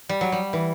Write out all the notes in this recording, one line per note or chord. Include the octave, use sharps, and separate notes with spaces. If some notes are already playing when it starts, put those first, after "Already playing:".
G3
F#3
G3
E3